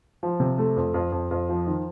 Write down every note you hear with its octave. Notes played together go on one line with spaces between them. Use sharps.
F3
C3
A3
F2
F2
F2
F2
F3
D#3